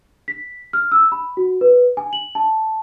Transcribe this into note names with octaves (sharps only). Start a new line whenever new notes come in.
B6
F6
E6
B5
F#4
B4
G#5
F#7
A5